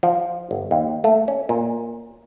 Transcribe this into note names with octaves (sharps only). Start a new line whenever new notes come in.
F3
G1
D#2
A3
C#4
A#2